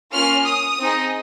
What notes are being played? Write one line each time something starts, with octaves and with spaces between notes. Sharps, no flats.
A#3 C#4 F4 F6
D#6
C4 D#4 G#4